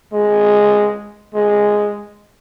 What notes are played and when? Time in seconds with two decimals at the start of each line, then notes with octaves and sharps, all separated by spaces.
0.13 G#3
1.34 G#3